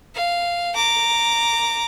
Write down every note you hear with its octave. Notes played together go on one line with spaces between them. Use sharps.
F5
A#5 D6